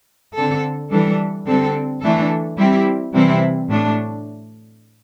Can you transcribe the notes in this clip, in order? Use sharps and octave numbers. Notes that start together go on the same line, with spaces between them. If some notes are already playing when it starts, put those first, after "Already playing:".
D3 C4 A4
E3 G3 D4 A4
D3 G3 C4 A4
E3 A3 D4 A4
G3 C4 E4 G4
C3 E3 G3 C4 E4
A2 A3 D4